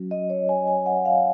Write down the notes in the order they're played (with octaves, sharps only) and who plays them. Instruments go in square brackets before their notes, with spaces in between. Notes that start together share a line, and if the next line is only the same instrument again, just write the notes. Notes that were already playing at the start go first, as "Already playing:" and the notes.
Already playing: [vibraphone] F#3 C#4 F#4
D#5
C#5
G#5
G#5
F#5
F5